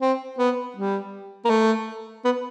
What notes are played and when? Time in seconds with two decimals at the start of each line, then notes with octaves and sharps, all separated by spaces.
0.01 C4
0.39 B3
0.76 G3
1.45 A#3
1.50 A3
2.25 B3